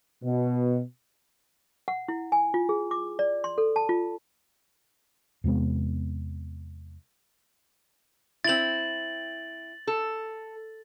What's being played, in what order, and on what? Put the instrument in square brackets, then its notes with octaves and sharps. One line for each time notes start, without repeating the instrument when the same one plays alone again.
[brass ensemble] B2
[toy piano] F#5
E4
G#5
F4
G#4
D6
D5
C6
A4
A5
F4
[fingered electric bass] E2 C3 G#3 B3
[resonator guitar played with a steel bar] C4 E4 [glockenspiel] A6 F#7
[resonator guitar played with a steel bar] A4